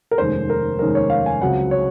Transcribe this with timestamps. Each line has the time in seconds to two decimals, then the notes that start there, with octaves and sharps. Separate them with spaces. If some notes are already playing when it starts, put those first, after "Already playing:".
0.11 A#4
0.18 F1 D#2 D#3 G#3 C#4 C5
0.50 A#4
0.79 F1 D#2 D#3 G#3 C#4 A#4
0.95 C#5
1.10 F5
1.26 G#5
1.41 C#2 C#3 F#3 C4 F#5
1.71 C#5